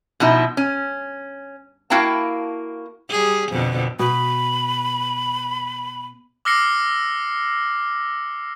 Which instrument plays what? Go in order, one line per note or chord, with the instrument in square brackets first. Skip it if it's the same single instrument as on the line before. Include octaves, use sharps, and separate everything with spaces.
[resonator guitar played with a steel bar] B2 F3 D#4 E4
C#4
A#3 E4 F#4 F5 G5 A5
[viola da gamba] G3 G#4
F2 B2 D3
[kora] B2 [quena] B5
[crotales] D6 E6 F6 A#6 C7 C#7